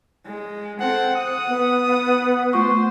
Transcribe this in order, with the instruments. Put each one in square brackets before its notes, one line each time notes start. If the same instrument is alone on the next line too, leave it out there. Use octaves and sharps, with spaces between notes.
[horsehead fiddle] G#3
[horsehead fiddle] C4 A4 [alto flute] C5 [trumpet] F#5
[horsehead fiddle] F#5 [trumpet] D#6
[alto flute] B3
[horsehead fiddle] F#5
[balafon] A3 F4 C#6 [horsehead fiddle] C5